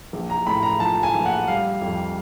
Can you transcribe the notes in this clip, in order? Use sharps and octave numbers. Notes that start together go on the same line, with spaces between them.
A#1
A#5
A2 B5
A#5
F3 A5
G#5
A#1
F#5
G3 F5
F2